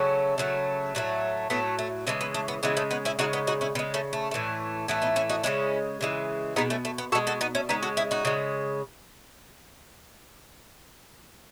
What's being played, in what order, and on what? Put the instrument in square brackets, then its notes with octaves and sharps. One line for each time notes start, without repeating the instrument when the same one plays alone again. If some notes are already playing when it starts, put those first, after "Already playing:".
Already playing: [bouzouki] C#3 F#3 A3 C#4
C#3 F#3 A3
A2 F#3 A3
A2 F#3 A3 B3
A3
C#3 E3 G#3 A3
B3
A3
B3
C#3 E3 G#3 B3
A3 C#4
B3 D#4
C#4 E4
C#3 G#3 D#4 F#4
B3 D#4
D#4 F#4
C#4 E4
C#3 B3
G#3
A3 C#4
A3
A2 E3 A3
A2 E3 A3 B3
B3 D#4
C#4 E4
D#4 F#4
C#3 E3 G#3 C#4 E4
C#3 E3 G#3
B2 G#3 B3 D#4
A3 C#4
A3
B3
B2 G#3 F#4 A4
F#4 A4
B3 D#4
A3 C#4
C#3 G#3 B3 D#4
F#4 A4
E4 G#4
D#4 F#4
C#3 G#3